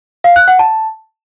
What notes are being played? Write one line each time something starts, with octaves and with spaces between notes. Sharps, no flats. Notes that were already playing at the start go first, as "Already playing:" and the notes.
F5
F#6
F#5
A5